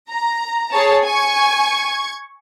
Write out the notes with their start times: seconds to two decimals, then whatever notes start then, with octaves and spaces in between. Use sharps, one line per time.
0.10 A#5
0.72 G#4 C#5 A5
1.04 G#5 C#6 G#6